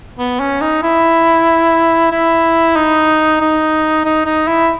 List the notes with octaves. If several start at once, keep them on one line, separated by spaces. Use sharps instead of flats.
B3
C#4
D#4
E4
E4
D#4
D#4
D#4
D#4
E4